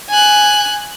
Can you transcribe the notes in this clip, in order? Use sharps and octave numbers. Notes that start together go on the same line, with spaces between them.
G#5 F#6